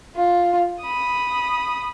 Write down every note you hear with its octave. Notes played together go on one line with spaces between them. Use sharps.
F4
B5 D#6